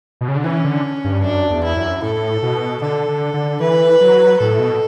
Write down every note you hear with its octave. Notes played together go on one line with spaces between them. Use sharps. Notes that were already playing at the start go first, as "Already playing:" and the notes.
B2
C#3
D3
E3 C#4
D3
G2
F#2 D4
E2
E4
F#2
A2 A4
B2
D3 A4
D3
D3
E3 B4
F#3
A2 A4
B2